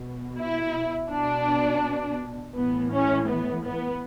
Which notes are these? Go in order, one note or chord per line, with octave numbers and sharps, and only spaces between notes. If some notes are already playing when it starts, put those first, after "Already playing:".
Already playing: B2
E4
B2 D4
A2 E3 B3
C#4
B3
B3